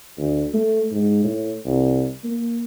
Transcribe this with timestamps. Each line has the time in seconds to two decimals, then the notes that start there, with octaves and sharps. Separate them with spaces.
0.18 D2
0.54 A3
0.91 G#2
1.24 A2
1.65 C2
2.24 A#3